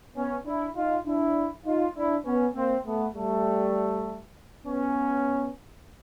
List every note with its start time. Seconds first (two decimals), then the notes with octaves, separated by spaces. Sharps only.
0.16 B3 C#4
0.45 D4 E4
0.76 D#4 F4
1.06 D4 E4
1.65 D#4 F4
1.95 D4 E4
2.25 B3 C#4
2.55 A#3 C4
2.86 A3 B3
3.16 G3 A3
4.65 B3 C#4